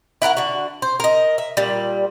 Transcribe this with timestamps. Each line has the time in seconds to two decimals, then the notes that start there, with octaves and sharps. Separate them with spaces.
0.22 E4 F#4 A#4 F#5
0.37 D3 F#4
0.82 C5
1.00 A#4 D#5
1.38 E5
1.57 A#2 G3